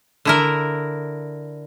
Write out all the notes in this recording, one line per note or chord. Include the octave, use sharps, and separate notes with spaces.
D3 E4 A#4